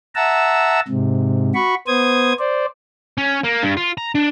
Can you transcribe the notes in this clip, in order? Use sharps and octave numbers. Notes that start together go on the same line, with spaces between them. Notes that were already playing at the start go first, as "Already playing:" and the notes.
E5 F#5 A5 A#5 E6
G#2 C3
F#4 B5 C#6
B3 C5 D#6 G#6
C5 D5
C#4
A#3
G2
F4
A#5
D4